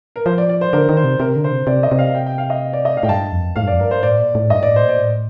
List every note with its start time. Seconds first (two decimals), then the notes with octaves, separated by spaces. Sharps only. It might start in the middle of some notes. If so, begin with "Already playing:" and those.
0.16 A#4
0.26 F3 C5
0.38 D5
0.50 D5
0.61 C5
0.73 D3 A#4
0.89 D#3
0.97 C5
1.04 C3
1.20 C3 A#4
1.36 D3
1.44 C5
1.52 C3
1.67 C3 D5
1.83 D#5
1.92 C3
1.99 F5
2.14 G5
2.26 G5
2.38 F5
2.50 D#5
2.73 D5
2.85 D#5
2.97 F5
3.03 A2 G5
3.09 G2 A5
3.32 F2
3.56 A2 F5
3.63 G2
3.67 D5
3.71 F2
3.80 G2 A#4
3.91 C5
4.03 A2 D5
4.19 A#2
4.35 A2
4.50 G2 D#5
4.63 A2 D5
4.76 C5
4.82 A#2
4.89 D5
4.97 A2